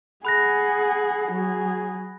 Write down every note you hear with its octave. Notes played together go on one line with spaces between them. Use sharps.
G#4 F#5 B5 F#6 A#6
F#3 G#4